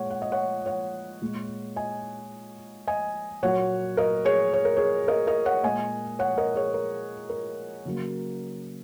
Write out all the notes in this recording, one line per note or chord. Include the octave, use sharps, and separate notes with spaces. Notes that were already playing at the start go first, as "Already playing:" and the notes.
Already playing: A#2 G#3 C#5 F#5
F#5
D#5
C#5 F#5
C#5 F#5
A#2 G#3
D#5 G#5
D#5 G#5
A#2 F#3 A#3 C#5 F#5
A#4 D#5
G#4 C#5
C#5
A#4
G#4 C#5
A#4 D#5
A#4 D#5
C#5 F#5
A#2 G#3 D#5 G#5
C#5 F#5
A#4 D#5
G#4 C#5
A#4
A#4
C#3 F#3 A#3